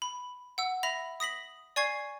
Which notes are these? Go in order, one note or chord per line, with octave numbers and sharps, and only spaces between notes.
B5
F#5 E6
E5 B5 A#6 F7
D#6 A#6 B6 F#7
D5 G#5 C#6 G#6 C7